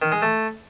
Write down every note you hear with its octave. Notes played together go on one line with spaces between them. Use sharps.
D#3
G#3
A3